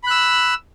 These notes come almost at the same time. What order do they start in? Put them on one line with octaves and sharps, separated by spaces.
B5 F#6 E6